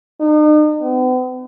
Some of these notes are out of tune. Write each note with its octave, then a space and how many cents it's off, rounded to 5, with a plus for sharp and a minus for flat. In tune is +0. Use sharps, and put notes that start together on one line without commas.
D#4 -40
B3 +45